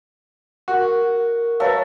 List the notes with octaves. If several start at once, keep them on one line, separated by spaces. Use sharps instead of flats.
F#4 A#4
F#3 B4 C#5 E5 F5 A5